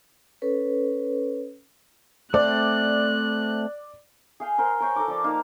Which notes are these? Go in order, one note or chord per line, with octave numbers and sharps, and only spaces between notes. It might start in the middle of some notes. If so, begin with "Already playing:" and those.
C#4 A4 B4 C#5
A3 C4 D5 F#6
G#4 F5 G5
A#4 C5 C6
A#4 C#5 G5 G#5
A4 A#4 A#5 D6
F3 D5
A#3 D#4 F5